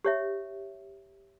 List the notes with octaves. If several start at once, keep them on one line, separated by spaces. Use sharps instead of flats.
G4 C#5 E5